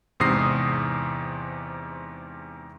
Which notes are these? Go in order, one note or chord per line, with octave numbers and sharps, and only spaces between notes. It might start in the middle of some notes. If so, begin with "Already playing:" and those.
E2 G#2 C3 D#6 A#6 C7